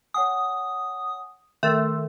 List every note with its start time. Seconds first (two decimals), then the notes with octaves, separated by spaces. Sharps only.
0.14 C#5 F#5 G#5 D#6
1.63 D#3 A3 C6 E6